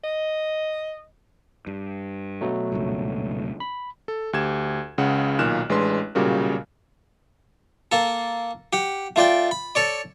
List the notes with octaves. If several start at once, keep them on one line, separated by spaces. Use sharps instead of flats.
D#5
G2
B2 F#3 A3
C#2 G2 A#2
B5
A4
D2 G4 G#6 E7
C#2 C#3 F#5
B1 A#2 D#3 F6 F#6 E7
A1 G#3 D4 B4 C6
B1 A#2 C#3 G3 F#4 A#4
A#3 A4
G4 F#5
A3 F4 D5 G5
B5
A4 C#5 D5